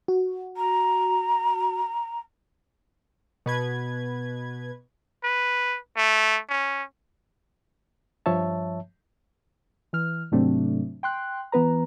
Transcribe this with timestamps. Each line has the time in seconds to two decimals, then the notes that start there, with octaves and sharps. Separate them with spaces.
0.08 F#4
0.57 A#5
3.46 B2 B4 G#6
5.24 B4
5.97 A3
6.49 C#4
8.26 G2 F3 C#5 E5 A5
9.93 E3 F6
10.32 G#2 C3 F#3 A3 C4 D4
11.03 G5 C6 F#6
11.52 E3 B3 B4 A#5